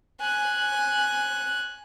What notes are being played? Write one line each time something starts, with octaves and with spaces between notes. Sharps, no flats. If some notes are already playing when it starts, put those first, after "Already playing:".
G#5 F#6